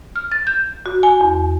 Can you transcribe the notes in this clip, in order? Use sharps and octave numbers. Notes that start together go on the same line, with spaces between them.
F6
A6
G6
F#4
G#5
E2